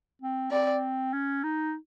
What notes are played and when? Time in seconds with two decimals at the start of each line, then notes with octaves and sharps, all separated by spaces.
0.22 C4
0.51 C4 D5
1.13 C#4
1.44 D#4